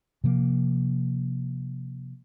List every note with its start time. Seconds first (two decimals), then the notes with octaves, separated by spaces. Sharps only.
0.24 C3 F3 A#3